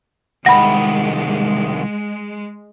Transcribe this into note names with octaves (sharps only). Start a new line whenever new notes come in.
C2 D#3 G#3 F#5 B5 A#6